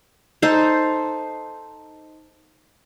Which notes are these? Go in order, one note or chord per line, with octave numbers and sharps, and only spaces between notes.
D#4 A4 C5